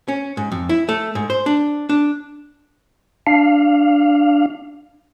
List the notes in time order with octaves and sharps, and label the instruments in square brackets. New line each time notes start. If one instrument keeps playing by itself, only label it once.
[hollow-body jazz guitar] C#4
G#2
F2
E4
A3
G#2
C5
D4
D4
[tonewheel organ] D4 F5